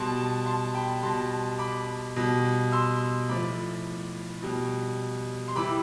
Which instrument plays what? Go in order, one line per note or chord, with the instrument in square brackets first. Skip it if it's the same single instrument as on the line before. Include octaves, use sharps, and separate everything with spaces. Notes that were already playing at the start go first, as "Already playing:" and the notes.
Already playing: [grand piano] B2 G3 A5 C6
A5 C6
G5 B5
B2 G3 A5 C6
B5 D6
B2 G3
C6 E6
A2 F3 B5 D6
B2 G3
C6
C3 E3 G3 B5 D6